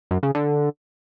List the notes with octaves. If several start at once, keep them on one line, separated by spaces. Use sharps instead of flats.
F#2
C#3
D3